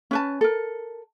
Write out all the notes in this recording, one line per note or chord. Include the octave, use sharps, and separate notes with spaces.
C#4 B4 A5
A4 A#4